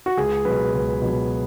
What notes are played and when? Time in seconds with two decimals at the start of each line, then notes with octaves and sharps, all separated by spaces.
0.06 F#4
0.17 C#2 G#4
0.45 B2 F#3 B4
0.74 C#2
1.02 B2 F#3